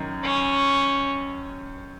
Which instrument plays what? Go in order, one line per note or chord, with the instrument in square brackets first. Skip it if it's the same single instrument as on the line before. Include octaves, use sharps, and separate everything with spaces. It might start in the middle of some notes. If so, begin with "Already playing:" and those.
Already playing: [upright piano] F#2 D#3
[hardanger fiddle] C#4